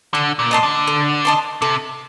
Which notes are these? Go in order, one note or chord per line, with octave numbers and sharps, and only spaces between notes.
D3 A4
A#2
D#5 A5 C6
D3
A4
D#5 A5 C6
C3 A4